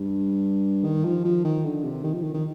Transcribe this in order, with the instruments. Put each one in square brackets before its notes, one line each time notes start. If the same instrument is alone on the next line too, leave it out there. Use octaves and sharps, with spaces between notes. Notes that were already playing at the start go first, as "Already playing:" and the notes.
Already playing: [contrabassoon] G2
D#3
F3
F3
D#3
D3
C3
D#3
F3
D#3
D#3